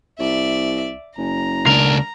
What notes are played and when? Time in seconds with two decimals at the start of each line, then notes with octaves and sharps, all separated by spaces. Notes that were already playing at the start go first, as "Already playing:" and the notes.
0.19 C2 D5 E5
1.18 F#1 A#5
1.66 C#2 D4 A#4